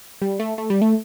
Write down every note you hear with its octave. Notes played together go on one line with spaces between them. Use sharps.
G3
A3
A3
G3
A3